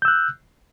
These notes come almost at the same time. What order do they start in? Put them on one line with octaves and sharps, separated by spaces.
G6 E6 F#6